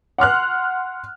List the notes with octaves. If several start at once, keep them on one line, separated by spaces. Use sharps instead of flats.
F#5 C6 F6 F#6